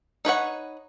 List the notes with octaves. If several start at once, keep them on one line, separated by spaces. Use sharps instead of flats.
D#4 B4 C#5 F#5